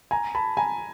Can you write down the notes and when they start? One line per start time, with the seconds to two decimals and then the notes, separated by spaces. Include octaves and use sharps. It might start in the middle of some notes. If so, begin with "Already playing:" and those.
0.11 G#5 A#5
0.35 A5 B5
0.57 G#5 A#5